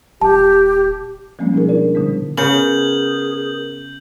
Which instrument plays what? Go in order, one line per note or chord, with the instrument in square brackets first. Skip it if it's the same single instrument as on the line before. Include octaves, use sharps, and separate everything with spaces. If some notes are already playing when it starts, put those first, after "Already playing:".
[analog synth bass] D#1 [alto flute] G4 [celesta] A5
[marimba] F3 G3 G#3 A#3 C4 C#4
B2 D#4 G#4 A#4
D4 E4 A#4 D5
A#2 D3 G3 B3
[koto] C#3 [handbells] B3 A#4 [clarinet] G#4 [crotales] G6 F#7